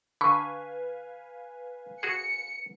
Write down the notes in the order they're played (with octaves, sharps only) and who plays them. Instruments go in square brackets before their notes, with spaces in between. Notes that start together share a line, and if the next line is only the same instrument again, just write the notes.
[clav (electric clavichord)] D3 [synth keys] B4 F5 G#5 [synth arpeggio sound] B5 C#6
[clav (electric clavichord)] F#4 G#4 [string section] C#7